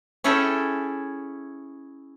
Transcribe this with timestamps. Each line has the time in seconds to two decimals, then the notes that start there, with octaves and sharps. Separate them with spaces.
0.24 C#4 E4 G#4 A4 G5 G#5